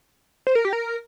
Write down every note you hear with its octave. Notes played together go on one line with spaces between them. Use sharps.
C5
A#4
G4
A#4